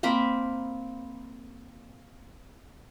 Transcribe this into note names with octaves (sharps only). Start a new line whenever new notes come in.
A#3 C4 A#5 B5